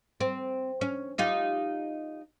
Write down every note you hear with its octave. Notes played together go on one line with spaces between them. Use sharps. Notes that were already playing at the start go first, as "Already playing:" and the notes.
C4
C#4
D#4 F4 G4